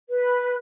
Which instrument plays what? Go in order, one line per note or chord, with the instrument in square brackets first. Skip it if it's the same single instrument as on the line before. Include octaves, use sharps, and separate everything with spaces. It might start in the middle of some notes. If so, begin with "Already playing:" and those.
[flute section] B4